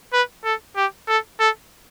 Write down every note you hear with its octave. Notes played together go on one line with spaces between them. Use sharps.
B4
A4
G4
A4
A4